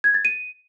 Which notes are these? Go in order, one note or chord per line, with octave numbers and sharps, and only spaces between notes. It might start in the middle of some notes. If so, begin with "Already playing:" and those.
G#6
A6
D#7